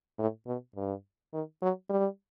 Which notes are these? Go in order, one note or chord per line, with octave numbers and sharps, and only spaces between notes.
A2
B2
G2
D#3
F#3
G3